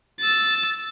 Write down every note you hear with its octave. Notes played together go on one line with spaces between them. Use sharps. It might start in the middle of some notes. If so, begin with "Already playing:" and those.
E6 A6